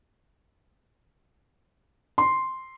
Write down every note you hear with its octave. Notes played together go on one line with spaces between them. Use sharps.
C6